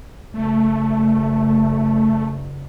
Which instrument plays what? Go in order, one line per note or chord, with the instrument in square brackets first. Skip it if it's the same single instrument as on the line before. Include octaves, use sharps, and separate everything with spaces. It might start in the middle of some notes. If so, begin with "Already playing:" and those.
[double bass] F#1 [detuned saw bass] A3